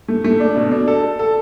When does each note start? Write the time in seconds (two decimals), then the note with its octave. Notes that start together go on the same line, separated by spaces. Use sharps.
0.08 A3
0.24 A3
0.40 D4
0.56 B2
0.71 D4
0.88 A4
1.03 A4
1.19 A4